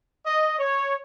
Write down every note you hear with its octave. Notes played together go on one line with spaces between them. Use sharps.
D#5
C#5